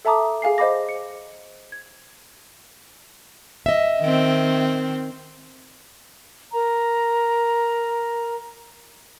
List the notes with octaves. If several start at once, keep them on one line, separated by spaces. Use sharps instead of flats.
A4 E5 A5 A#5 D6 D#6
G#4 F5 G#5 C7
C5 D#5 F5 B5 D6 A#6
C#7
G#6
D#5 E5
D#3 C4
A#4 A#5